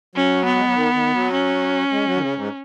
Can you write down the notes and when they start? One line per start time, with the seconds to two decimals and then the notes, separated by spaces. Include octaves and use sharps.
0.16 F#3 C#4
0.45 B3
0.56 G#3
0.65 F#3
0.75 D#3
0.94 D#3
1.13 F#3
1.33 C#4
1.92 G#3
2.06 F#3
2.17 D#3
2.21 C#3
2.36 G#2